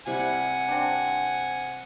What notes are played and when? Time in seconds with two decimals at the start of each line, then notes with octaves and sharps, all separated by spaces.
0.07 C3 G3 E4 F#5 G#5
0.69 C4 D4